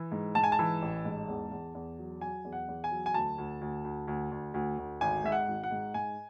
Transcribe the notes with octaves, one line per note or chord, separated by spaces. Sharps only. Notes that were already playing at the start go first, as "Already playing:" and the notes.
Already playing: E3
G#2
G#2 A5
G#5
A5
E3
A1
G#2
E2
E2
E2
F#3
F#3 G#5
E2
F#5
E2
G#5
F#3
G#5
D2 A5
D2
D2
D2
D2
D2
D2
D2
G#1 G#5
G#2 E5
F#5
G#1
F#5
G#2
G#2 G#5